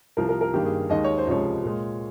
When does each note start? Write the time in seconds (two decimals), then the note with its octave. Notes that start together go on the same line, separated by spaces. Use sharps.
0.17 C2 C3 F3 A#4
0.29 A#4
0.41 A#4
0.54 G2 D#3 A#3 G4
0.65 G#4
0.89 D#2 D#3 G#3 D#5
1.04 C#5
1.18 C5
1.26 C#2 C3 F3 G#3 C#5
1.64 A#2 G#3